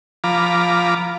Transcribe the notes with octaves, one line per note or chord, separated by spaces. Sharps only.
F3 F4 A#5 B5 D6